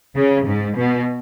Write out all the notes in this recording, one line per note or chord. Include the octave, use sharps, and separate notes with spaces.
C#3
G#2
B2